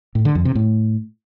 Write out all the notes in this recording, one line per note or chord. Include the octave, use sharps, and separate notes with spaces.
A2
D3
F2
C3
A2